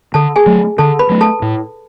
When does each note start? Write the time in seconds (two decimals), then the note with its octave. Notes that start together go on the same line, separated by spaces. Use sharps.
0.14 D3 A4 A5
0.36 G#4 G#5
0.46 F#3 A3
0.78 D3 A4 A5
0.99 B4 B5
1.09 F#3 A3
1.21 A4 A5
1.42 A2